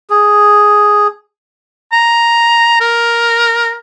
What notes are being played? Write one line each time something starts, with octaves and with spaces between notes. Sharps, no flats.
G#4
A#5
A#4